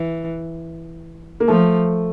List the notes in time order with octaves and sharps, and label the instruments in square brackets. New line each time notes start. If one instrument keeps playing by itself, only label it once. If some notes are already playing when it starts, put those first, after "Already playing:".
Already playing: [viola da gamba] E3
[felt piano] A#3
[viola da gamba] F3 [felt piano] A3